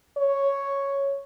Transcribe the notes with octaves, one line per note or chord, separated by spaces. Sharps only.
C#5